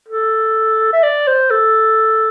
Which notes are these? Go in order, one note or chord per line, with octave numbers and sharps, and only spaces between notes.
A4
E5
D5
C5
A4